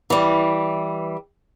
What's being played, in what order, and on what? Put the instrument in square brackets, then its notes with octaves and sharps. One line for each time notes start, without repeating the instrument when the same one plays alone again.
[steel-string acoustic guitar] E3 G3